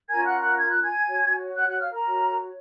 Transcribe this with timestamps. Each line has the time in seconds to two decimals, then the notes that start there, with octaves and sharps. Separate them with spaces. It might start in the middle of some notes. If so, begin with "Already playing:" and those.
0.09 C#4 F4 A#4 G#5 G#6
0.25 F#5 F#6
0.41 F#5 F#6
0.58 G#6
0.70 F#6
0.82 G#5 G#6
1.07 F#4 C#5
1.56 F#5 F#6
1.68 F#5 F#6
1.80 F5 F6
1.91 A#4 A#5
2.04 F#4 C#5